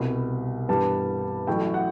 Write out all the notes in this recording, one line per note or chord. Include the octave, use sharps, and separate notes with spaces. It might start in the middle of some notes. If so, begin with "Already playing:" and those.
Already playing: C2 B2 G3
G2 E3 G3 B3 A5
A1 A2 F#3 A3 G5
F#5